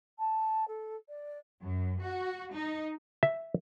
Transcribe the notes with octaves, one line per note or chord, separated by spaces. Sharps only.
A5
A4
D5
F#2
F#4
D#4
E5